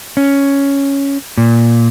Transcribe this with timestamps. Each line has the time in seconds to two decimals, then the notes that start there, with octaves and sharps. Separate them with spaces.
0.17 C#4
1.38 A#2